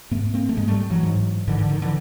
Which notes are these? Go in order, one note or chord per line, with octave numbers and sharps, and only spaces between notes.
G#2 A3 B3
A#3 C4
A3
G#2 G#3 A#3
G3 A3
E3 F#3
G#2
G#2 D3 E3
D3
D#3
D3 E3